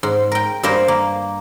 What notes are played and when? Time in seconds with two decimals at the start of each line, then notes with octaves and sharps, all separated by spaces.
0.03 G#2
0.32 A#4 G5
0.63 G2 A#3 A#4 C5 F5 C6
0.88 A#3